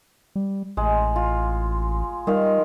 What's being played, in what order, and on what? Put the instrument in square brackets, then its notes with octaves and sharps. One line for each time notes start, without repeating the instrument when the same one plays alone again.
[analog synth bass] G3
[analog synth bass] A1 [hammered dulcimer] G#3
[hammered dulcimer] F4
[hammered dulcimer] D#3 F5 [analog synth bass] G3